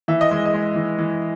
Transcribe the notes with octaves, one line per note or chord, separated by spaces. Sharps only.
E3 E5
D#5
G#3
D#5
G#3
E3
E3